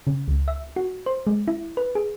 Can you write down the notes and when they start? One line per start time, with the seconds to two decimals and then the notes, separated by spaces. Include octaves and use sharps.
0.07 C#3
0.28 C#2
0.48 E5
0.76 F#4
1.06 C5
1.27 G#3
1.48 E4
1.77 B4
1.95 G#4